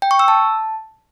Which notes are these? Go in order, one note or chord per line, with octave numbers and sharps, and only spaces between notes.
G5
C#6
E6
A5